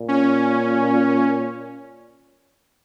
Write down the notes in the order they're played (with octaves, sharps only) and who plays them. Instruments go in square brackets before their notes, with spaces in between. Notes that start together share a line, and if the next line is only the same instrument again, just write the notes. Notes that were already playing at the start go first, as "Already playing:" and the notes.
Already playing: [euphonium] A#2
[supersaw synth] C#4